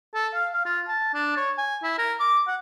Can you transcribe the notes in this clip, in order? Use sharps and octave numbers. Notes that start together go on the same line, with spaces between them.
A4
F5
F5
F4
A5
D4
C#5
G#5
E4
A#4
D6
F#5